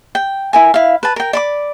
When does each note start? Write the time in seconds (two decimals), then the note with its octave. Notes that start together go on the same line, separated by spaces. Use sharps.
0.15 G5
0.53 E4 A#4 G#5
0.74 E4 F5
1.03 B4 A5
1.16 A#4 G5
1.33 D5 B5 D6